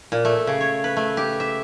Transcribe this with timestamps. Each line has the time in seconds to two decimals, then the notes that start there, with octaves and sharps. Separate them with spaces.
0.12 A#2
0.25 A3
0.47 C#3
0.60 C#5
0.84 B4
0.97 A3
1.17 G4
1.40 E5